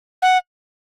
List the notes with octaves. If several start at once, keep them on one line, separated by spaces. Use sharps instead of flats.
F#5